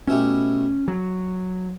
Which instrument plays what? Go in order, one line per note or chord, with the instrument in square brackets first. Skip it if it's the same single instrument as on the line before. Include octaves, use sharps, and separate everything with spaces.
[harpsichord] B2 A3 E4 G4 [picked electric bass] C#4
[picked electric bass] F#3